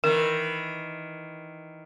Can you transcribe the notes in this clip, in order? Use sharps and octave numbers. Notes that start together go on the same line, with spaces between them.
D#3 E3 A#4